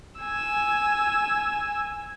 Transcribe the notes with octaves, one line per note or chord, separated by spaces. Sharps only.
G#5 E6